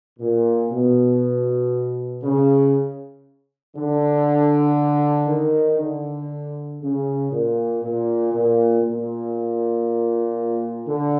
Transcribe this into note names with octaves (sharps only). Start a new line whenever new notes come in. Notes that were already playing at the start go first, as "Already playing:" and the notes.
A#2
B2
C#3
D3
D#3
D3
C#3
A#2
A#2
A#2
A#2
D3